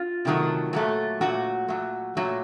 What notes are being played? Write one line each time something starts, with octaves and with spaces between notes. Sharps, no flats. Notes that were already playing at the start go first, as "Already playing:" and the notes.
Already playing: F4
C3 D#3 F#3 A3
A#2 F#3 A3
A#2 F#3 A3 F#4
A#2 F#3 A3
A#2 F#3 A3